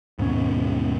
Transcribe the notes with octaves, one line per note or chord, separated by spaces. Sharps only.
D#2 G#2 B2 C#4